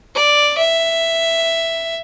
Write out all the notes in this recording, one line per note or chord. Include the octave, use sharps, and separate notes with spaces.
D5
E5